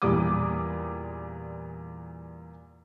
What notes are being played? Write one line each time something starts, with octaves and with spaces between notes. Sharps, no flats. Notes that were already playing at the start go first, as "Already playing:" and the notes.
E2 A#2 G3 D6 D#6